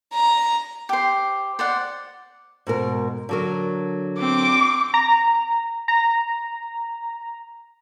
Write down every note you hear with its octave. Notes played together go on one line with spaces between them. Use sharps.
A#5
G4 C5
C5 D5 F#5
G#2 B2 A#4
D3 F#3 A#4
C4 D6
A#5
A#5